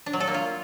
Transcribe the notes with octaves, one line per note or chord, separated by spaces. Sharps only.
D4
F#3
A4
A#3
F4